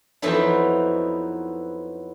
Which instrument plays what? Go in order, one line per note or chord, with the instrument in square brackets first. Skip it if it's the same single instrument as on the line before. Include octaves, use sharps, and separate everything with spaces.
[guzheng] F2 E3 F#3 B3 D#4 E4